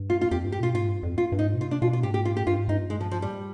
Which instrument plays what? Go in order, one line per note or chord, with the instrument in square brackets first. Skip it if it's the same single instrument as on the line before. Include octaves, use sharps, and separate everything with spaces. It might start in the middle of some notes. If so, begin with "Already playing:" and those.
Already playing: [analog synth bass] G2
[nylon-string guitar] F4
F4
[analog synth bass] F2 [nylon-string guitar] G4
[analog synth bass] G2
[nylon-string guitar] G4
[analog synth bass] B2 [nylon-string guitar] F4
[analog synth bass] G#2 [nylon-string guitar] F4
[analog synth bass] G2
F2
[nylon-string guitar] F4
[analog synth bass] G2
[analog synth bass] G#2 [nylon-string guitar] D#4
[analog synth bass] B2
[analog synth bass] C3 [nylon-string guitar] F4
[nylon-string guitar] D4
[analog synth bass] B2 [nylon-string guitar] F4
[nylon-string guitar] F4
[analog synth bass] G#2 [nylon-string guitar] G4
[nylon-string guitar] G4
F4
G4
[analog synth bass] G2 [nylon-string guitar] F4
[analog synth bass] G#2
[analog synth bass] G2 [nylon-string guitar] D#4
[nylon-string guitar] G#3
F3
F3
G3